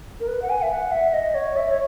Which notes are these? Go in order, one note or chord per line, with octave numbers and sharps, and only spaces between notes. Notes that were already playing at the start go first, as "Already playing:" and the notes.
A#4
B4
F#5
G#5
E5
F#5
E5
D#5
C#5
E5
C#5